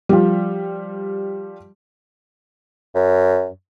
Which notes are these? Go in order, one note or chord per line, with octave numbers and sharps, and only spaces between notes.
F3 G3
F#2